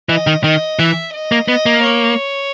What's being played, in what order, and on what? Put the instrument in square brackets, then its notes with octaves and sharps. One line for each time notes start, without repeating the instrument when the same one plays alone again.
[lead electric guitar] E3 [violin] D#5
[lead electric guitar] D#3
[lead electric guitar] D#3 [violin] D#5
[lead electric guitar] E3 [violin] E5
[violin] D#5
[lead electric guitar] A#3
[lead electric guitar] B3 [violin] D#5
[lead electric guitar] A#3
[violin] C#5